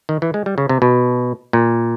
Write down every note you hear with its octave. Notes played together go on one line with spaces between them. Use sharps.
D#3
E3
G#3
G3
C#3
C3
B2
A#2